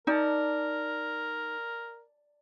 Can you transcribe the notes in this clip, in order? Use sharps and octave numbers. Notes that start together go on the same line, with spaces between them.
D#4 A#4 D5 A5